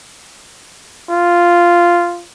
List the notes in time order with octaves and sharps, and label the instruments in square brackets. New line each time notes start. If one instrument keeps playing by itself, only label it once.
[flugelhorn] F4